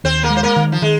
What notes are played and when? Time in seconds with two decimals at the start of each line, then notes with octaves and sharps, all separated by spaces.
0.04 D#2 C4 C5
0.23 A#3 A#4
0.30 G#3
0.37 C5
0.43 A#3 A#4
0.56 D#3
0.72 F3
0.82 D#3 G#3